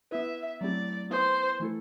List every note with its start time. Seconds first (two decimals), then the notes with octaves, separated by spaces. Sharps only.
0.11 B3 E4 B4 E5
0.61 F#3 A3 C4 E4 G4 D5
1.10 B3 E4 B4 C5
1.60 E3 A3 E4 A4